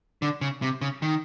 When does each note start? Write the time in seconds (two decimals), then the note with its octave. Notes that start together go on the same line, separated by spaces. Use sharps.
0.22 D3
0.41 C#3
0.62 C3
0.81 C#3
1.02 D#3